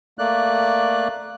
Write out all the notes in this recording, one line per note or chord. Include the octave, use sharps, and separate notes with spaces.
A3 A#3 D5 F#6